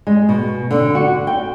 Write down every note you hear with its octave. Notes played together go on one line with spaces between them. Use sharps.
G#3
B2
D3
F#4
G5